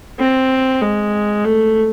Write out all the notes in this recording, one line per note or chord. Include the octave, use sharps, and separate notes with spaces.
C4
G#3
A3